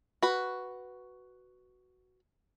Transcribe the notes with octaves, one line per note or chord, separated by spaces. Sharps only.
F#4 B4